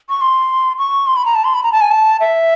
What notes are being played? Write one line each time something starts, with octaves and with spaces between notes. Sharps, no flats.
C#6
C6
C#6
C6
B5
A#5
A5
C6
B5
A#5
A5
G#5
A5
E5